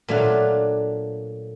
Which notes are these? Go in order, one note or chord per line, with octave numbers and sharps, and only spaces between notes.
A#2 F#3 A3 D4 F4